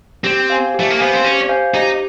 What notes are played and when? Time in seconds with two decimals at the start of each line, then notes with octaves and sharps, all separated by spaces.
0.24 C4 G4
0.49 C5 F5 G#5
0.74 G4
0.80 A3
0.90 A#3
0.99 B3 C5 F5 G#5
1.13 C4
1.24 C#4 G4
1.49 C5 F5 G#5
1.74 D#4 G4